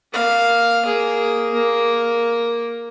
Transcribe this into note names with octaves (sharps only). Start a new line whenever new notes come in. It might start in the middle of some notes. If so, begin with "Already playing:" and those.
A#3 F5
A#3 G#4
A#3